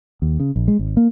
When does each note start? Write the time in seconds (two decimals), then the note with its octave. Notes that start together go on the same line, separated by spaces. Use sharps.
0.22 D#2
0.40 C#3
0.56 A#1
0.68 G#3
0.79 G#1
0.97 A#3